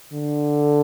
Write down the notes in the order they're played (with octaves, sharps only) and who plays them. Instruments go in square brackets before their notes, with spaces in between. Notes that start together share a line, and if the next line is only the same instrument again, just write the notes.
[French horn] D3